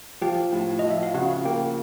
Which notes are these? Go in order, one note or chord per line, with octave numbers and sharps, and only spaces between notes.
F3 G4 G5
A2
F3 D#5
E5
F5
C#3 F#4 F#5
A#3 G4 G5